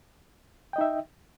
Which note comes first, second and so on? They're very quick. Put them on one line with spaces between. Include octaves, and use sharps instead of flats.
G5 D#5 D#4 E5